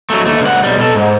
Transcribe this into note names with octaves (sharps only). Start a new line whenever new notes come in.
F#3 A3
D#2 A3
C#2 F#5
B1 G3
B2 A4
G#2